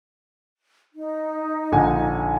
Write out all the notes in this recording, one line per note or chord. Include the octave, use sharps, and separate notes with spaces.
D#4
A#1 D3 G#5